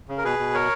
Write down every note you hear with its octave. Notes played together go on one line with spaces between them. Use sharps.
C#3
A#4
B2 G#4 B4
B2
A#4 C#5